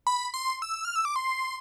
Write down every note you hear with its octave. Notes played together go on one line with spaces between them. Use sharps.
B5
C6
E6
F6
E6
D6
C6